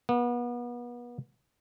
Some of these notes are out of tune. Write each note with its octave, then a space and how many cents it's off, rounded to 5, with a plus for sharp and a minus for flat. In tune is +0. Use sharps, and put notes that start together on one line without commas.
B3 -35